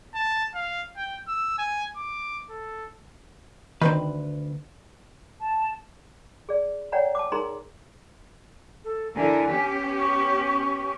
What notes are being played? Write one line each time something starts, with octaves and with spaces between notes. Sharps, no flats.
A5
F5
G5
E6
G#5
D6
A4
D2 G2 D#3 C4 B4
A5
G#4 D5
C#5 D5 F#5 G5 A#5
A5 D6
D#4 G#4 A#4 A#5 C6
A4
D3 E4 A#4 G#5
B3 C#4 G4
C#6